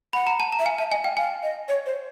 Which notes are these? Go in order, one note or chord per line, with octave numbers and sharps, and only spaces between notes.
F#5 B5
A#5
A5
A#5
E5
F5 G#5
E5 A5
D#5 G#5
F5 G5
F5 G#5
D#5
C#5
C5